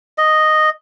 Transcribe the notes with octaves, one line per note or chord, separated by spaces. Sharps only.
D#5